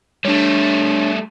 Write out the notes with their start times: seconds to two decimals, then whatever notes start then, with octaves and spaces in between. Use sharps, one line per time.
0.25 G3 A3 D4 C#5